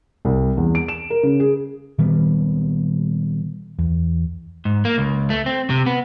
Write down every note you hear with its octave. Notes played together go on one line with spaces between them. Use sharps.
C2
E2
D7
E7
A#4
C#3
G#4
A#2 D#3 G3 B3
E2
G#2
A#3
C#2
A3
C4
C3
B3